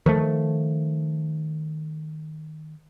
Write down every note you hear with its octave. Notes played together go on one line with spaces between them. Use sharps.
D#3 F3 A3